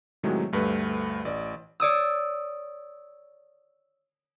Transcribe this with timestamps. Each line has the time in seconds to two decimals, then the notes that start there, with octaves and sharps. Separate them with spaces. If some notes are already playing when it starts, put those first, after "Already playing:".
0.23 A2 C3 D#3 F#3 G#3 A3
0.52 D2 G2 A3 B4
1.25 A1 D5 D#5
1.80 C#5 D5 D#6 E6